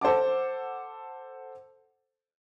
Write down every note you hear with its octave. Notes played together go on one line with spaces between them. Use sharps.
A4 C5 F#5 A5 D6